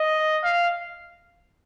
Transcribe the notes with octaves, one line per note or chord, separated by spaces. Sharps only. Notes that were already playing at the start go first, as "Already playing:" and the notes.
Already playing: D#5
F5